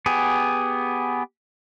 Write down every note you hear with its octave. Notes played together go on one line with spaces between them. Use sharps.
B3 G4 G#4